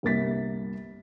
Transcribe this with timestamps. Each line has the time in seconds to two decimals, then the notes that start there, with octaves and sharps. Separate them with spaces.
0.03 G1 C2 A#3 A6 B6